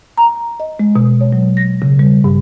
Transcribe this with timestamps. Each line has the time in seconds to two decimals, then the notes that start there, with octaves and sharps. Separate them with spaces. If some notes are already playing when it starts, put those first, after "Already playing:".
0.18 A#5
0.60 D#5
0.79 G#3
0.96 B2
1.21 C#5
1.33 F#3
1.57 A#6
1.82 C#3
1.99 G3
2.24 G2